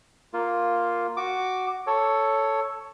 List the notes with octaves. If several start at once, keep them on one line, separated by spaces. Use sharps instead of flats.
A#3 F4
F#4 D6
A4 C#5